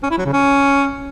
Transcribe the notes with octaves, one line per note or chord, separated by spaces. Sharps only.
C#4
E4
F#3
C#3
C#4